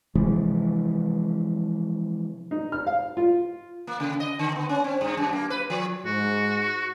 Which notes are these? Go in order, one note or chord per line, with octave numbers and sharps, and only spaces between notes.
C3 E3 F3 G#3
D#4
F6
F5
F4
A#3
C#3
D#5
D3
B3
C#4
C4
G2
F#2
A#3
B4
F3
G#2 F#4